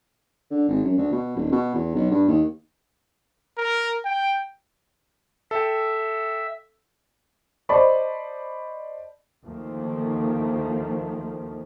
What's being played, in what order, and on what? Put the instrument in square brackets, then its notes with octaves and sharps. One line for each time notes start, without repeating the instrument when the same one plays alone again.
[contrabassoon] D3
G#1
F#2
D2
B2
D#1
B2
E2
B1
G2
D#2
[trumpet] A#4
G5
[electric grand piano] A4 G5 [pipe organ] E5
[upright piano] C5 D5 D#5 A5 B5 C#6
[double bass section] D2 D#3 F3 A3 A#3